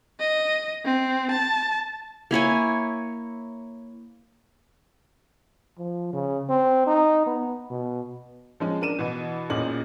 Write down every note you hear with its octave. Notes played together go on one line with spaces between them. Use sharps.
D#5
C4
A5
A#3 E4 C#5 G#5
F3
C#3
C4
D#4
B3
B2
F3 G#3 C#4
D4 A#4 D#7 E7
B2 E3
E1 A#2 C#4 D#5 F#7